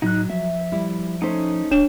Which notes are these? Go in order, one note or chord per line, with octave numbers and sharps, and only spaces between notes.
A2 F#3 D#4 F#6
F3 E5
G3 E4
A3 C#4 D#4 A4 C5
D1 D4 C#5 E7